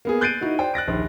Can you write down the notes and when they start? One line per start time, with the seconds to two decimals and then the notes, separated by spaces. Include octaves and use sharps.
0.05 A#3 B3 G#4
0.21 F#6 G6 A6 C7 D7 D#7
0.41 D#4 E4 F#4
0.59 C5 D5 G5
0.74 F#6 A6 A#6 D7
0.88 A#1 D#2